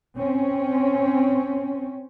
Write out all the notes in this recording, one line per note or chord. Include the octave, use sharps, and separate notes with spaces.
C4 C#4